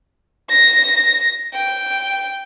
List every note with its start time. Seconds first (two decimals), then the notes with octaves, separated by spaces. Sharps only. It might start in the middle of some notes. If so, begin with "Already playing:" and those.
0.50 A#6
1.54 G5